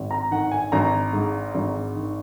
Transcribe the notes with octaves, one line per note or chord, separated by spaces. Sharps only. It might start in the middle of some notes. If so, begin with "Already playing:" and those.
Already playing: G#1
A#5
D#3 F#5
G#5
G#1 A#5
G#2
G#1
D#3